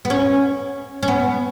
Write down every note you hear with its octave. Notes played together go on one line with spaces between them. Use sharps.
B3
C#4
C#4
B3